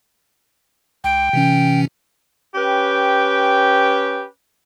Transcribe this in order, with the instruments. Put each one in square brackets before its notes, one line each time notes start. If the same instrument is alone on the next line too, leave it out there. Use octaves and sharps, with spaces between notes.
[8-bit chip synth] C#2 [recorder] G5
[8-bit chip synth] C3 E3 C#4
[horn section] C#4 G4 B4 G5